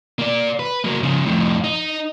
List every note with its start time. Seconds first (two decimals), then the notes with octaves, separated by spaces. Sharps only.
0.19 A#3 D5
0.59 B4
0.85 F#3 A#3
1.03 C#3 F3
1.26 F2 A2
1.64 D#4